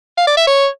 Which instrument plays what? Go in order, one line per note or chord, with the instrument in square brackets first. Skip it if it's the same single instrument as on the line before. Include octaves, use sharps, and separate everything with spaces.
[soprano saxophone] F5
D5
E5
C#5